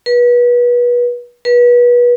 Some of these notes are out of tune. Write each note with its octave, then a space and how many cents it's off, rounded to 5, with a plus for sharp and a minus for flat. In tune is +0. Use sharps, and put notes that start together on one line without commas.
B4 -30
B4 -30